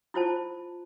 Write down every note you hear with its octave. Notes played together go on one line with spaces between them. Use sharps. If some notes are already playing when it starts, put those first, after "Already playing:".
E4 F4 C5 A5